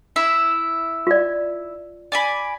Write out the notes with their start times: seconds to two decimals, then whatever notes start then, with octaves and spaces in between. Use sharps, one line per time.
0.16 E4 E5
1.07 F4 D5
2.12 D5 G#5 B5